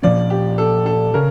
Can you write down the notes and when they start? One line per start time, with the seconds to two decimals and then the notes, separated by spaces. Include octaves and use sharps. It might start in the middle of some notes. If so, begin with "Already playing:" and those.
0.02 A#2 F3 C#4 D5
0.30 G4
0.58 A4
0.86 A4
1.14 C#3 A#4